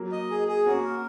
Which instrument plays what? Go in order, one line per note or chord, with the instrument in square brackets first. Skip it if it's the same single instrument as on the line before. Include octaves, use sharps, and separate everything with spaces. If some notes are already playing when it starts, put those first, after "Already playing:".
Already playing: [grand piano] F#3 A#3
[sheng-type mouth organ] D#5
G#4
G#4
[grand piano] A#3 C#4 [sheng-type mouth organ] F#4
[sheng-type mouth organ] A#4